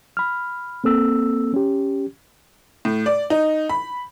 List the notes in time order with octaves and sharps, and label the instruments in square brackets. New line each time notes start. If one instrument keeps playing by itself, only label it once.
[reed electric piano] B5 F6
A#3 C4 A4 E6
C#4 G4
[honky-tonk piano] A2
D5
D#4
B5